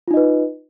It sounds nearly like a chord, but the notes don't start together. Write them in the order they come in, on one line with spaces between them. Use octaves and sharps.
F4 D#4 D#5 B4